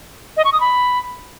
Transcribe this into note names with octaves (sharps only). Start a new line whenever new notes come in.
D#5
C#6
D#6
B5